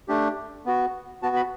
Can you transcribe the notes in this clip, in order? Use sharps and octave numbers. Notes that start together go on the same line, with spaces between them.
A3 D4 G4
B3 F#4
B3 F#4 A5
B5